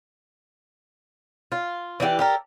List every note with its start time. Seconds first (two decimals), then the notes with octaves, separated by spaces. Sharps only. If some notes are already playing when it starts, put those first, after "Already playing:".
1.52 F4
2.00 E3 D4 F#4 G4
2.19 G4 A4 A#4